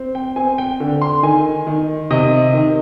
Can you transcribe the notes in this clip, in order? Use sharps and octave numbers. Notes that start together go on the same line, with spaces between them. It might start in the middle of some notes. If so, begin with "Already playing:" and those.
Already playing: C4
G5
C4 G#5
G5
D3
C6
D#3 G#5
D#3
C3 D#5
D#3